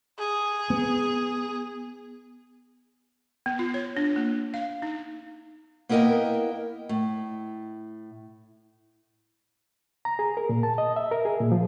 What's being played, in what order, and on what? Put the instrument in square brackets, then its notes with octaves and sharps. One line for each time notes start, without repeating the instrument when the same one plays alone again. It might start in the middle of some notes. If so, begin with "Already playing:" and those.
[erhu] G#4
[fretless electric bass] B3
[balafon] B3
F4
C#5
D4
A#3
F5
D#4
[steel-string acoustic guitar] A#3 B3 E4 A#4 D#5 G5
A2
[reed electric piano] A#5
G#4
A#4
A#2
A5
D#5
E5
A#4
G#4
A#2
F3